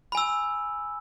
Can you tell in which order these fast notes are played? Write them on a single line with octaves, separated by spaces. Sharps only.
B5 G#5 E6